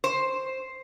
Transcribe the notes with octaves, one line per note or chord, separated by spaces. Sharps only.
C5